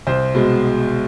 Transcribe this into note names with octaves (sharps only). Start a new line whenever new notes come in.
C2 C5
B2 G#3